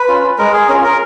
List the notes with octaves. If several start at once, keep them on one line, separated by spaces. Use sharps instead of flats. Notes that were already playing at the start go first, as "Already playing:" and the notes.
Already playing: B4
C#4 F4
G#3 A#4
G#4
C#4 F4 A#4
A#4